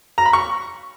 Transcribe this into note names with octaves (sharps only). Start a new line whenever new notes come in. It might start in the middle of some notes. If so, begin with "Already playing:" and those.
A#5
B5
C#6